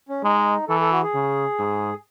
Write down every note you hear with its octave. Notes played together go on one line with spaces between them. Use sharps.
C#4
G#3 D#4
E3 A4
A4
F#4
G#4
C#3
G#2